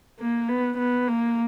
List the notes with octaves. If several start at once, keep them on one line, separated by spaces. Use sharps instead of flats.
A#3
B3
B3
A#3